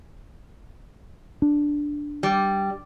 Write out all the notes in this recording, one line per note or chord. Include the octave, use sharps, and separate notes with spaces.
D4
G3